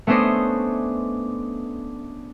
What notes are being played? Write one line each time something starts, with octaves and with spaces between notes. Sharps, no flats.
A3 B3 C#4 D4 C5 D#5